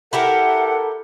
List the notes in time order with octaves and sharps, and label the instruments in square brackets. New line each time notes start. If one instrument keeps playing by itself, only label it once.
[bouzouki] E4 G4 A#4 [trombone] A4 [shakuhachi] F#5